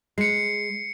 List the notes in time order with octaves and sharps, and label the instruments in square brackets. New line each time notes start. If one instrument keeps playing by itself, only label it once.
[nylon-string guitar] G#3 [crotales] C7 C#7